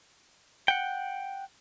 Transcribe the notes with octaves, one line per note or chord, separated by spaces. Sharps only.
F#5 G5